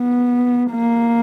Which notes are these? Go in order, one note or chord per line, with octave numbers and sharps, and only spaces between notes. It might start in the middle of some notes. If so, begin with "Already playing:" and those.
Already playing: B3
A#3